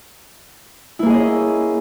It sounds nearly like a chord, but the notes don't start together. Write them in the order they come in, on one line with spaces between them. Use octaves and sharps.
E4 A#3 G#4 D#5 C#4